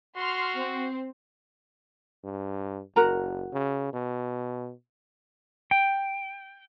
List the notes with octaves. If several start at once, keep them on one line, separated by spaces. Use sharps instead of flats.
F#4 C6 F6
C4
G2
F#1 F#4 A#4 A#5
C#3
B2
G5